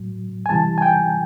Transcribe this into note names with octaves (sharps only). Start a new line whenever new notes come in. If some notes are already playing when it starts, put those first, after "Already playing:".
Already playing: A2 F#3
G#5
C3 E3 G3 A5
G#5
G5